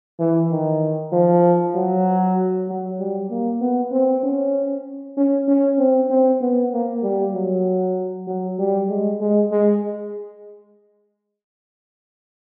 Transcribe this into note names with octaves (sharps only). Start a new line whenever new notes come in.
E3
D#3
F3
F#3
F#3
G3
A#3
B3
C4
C#4
C#4
C#4
C4
C4
B3
A#3
G3
F#3
F#3
G3
G#3
G#3
G#3